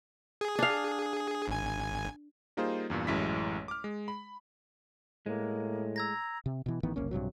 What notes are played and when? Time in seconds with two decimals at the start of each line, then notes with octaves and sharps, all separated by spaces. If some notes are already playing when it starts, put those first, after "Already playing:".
0.41 G#4
0.59 D4 F5
1.48 G#1 G#5
2.57 G3 A#3 D#4 F4 G#4 C5
2.90 E2 G2 A#2
3.07 A1 F#2 G#3 E4 B6
3.68 D6 F6
3.84 G#3
4.08 B5
5.26 A2 G#3 A#3
5.96 A#5 E6 G#6 A#6
6.46 C3
6.66 B2 E3
6.83 A1 D#3 E3 B3
6.96 F#1 C2 A#3 C#4
7.11 A#1 G2 C3 F#3